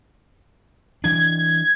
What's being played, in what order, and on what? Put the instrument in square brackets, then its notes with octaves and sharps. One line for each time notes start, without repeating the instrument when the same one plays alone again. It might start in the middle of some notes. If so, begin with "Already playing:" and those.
[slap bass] E3 D4 [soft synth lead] G#6